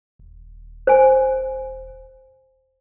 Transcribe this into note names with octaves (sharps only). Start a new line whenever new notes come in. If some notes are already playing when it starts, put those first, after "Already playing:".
D#1
C5 G#5